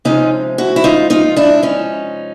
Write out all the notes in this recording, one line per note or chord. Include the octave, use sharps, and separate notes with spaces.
C3 F3 G#3 C#4 D#4
E4 F#4
E4
D#4 F4
D#4 F4
D4 E4
C#4 D#4